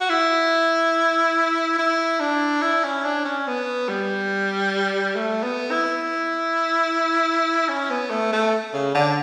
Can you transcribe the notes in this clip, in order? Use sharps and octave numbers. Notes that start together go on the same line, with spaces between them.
F#4
E4
E4
D4
E4
C#4
D4
C#4
B3
G3
A3
B3
E4
C#4
B3
A3
A3
C#3
D3